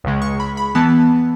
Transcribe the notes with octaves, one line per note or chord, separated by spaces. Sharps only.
C#2 C#3 G#3
C#6
B5
B5
E3 B3 A5